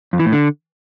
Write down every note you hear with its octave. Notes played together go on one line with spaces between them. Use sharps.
F2
E3
A2
D3